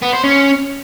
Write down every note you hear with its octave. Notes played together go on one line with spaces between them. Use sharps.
B3
C5
C#4